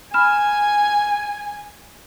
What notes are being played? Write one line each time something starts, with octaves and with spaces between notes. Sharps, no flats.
G#5 B5 F6 E7